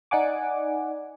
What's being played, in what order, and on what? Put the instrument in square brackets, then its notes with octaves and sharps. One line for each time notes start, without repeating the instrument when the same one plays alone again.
[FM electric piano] D#4 D5 F#5 G#5 D6